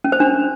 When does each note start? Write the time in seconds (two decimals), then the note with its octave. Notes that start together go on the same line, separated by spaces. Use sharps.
0.04 C#4
0.12 C5
0.20 D4